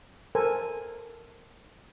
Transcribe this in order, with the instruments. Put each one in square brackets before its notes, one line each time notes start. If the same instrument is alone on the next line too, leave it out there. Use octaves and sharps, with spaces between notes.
[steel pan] A4 A#4 C5 G#5